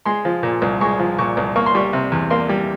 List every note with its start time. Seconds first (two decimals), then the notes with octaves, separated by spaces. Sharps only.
0.06 G#3 C6
0.25 F3
0.43 A#2
0.62 C2
0.81 G#3 C#6
0.99 F3
1.18 A#2 C#6
1.37 C2
1.56 A#3 C#6
1.66 C6
1.75 G3 C#6
1.93 C3
2.12 E2
2.30 A#3 C6
2.49 G3